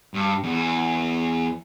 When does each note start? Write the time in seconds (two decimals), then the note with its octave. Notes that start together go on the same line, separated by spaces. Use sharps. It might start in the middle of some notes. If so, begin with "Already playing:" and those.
0.14 G2
0.43 E2